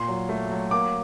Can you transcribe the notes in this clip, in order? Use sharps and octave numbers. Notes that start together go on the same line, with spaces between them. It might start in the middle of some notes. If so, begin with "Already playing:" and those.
Already playing: A#2 C6
F#3
A3
F#3
A#3 D6